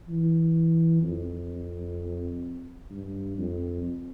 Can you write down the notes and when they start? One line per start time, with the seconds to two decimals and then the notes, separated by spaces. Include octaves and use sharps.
0.08 E3
1.02 F2
2.91 G2
3.38 F2